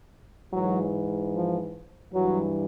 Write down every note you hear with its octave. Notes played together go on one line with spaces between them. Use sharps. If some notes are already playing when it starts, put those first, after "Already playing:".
G#2 E3 F#3
F3
G2 E3 F#3